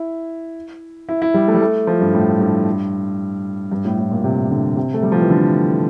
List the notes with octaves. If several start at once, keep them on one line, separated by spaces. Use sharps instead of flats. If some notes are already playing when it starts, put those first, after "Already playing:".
Already playing: E4
E4
E4
G3
A3
G3
A3
F3
G2
A2
G2
G2
A2
A2
A#2
C3
D3
C3
A3
G3
F3
E3
D3